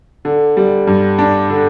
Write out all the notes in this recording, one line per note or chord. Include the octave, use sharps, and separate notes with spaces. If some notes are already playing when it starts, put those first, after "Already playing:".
D3
G3
G2
D4
D3